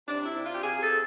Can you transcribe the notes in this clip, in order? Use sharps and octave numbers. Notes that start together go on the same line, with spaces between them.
C3 D4
E4
C3
F4
G4
C3 G#4
A4
C3